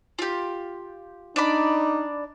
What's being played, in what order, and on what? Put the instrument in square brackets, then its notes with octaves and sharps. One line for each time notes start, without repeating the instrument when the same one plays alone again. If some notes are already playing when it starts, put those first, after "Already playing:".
[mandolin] F4 G4
[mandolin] D4 D5 B5 [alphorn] D#4